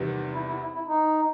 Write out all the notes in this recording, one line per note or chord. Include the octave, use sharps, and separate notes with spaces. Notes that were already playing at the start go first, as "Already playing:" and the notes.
Already playing: E2 C3 D#3 G3 B3
E4
E4
E4
E4
D#4